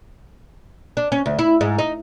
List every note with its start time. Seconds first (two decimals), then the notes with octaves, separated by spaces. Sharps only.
0.97 D4
1.12 C#4
1.26 D2
1.39 E4
1.61 G#2
1.78 D#4